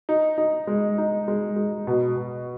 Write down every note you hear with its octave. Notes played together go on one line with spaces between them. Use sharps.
D#4
D#4
G#3
D#4
G#3
G#3
B2
B2